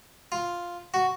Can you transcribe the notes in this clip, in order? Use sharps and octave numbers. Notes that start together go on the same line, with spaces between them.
F4
F#4